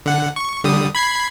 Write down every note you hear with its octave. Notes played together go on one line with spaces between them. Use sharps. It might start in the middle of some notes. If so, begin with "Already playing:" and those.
D3 F#5
C#6
D3 G3 D#6
B5 G#6 C7